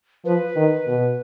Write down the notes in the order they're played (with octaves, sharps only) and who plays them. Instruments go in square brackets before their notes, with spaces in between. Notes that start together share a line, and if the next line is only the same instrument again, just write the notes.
[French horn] F3 [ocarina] B4
[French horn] D#3
B2